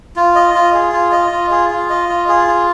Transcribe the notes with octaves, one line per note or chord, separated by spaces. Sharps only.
F4
D#5
F4
G#4
F4
D#5
F4
G#4
F4
D#5
F4
G#4
F4